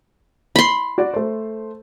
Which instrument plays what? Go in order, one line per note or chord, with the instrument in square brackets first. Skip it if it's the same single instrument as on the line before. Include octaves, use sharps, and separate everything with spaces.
[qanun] B5 C6
[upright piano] F#4 D5
A3 C5